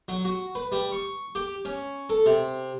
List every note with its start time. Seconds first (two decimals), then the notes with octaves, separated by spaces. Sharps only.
0.08 F#3
0.25 F#4
0.55 B4
0.72 G3
0.92 C#6
1.35 G4
1.65 C#4
2.10 A4
2.26 C3